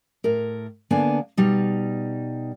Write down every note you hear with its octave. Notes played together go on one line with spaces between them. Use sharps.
A2 A#4
D3 A#3 B3 D4 G#5
B2 G3 D#4